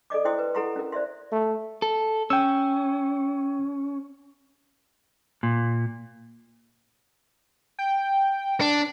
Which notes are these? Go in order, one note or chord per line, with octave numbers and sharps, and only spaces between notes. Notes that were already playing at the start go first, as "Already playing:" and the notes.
A4 D5 D#5 D6
E4 C5 G5 C6 D#6
B4
E4 A4 F#5 A#5 C6 C#6
C#4 A#4
C5 D5 E5 C6
A3
A4
C#4 G5 E6
A#2
G5
D4